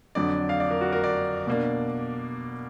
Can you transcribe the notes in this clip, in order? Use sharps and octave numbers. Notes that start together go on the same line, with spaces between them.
F2 D3 F#3 D4 D5
F5
D5
A#4
F#4
A#4
D5
B2 A#3 D4